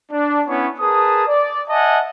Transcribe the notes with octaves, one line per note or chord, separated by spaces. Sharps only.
D4
B3 C#4 E4 C#5
G#4 A#4 B4 A5 D#6
D5
D#5 E5 F#5 G#5 A5